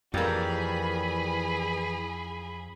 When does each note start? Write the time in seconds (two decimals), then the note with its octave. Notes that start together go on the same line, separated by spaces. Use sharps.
0.14 F2 E3 G3 A#3 G#4 B5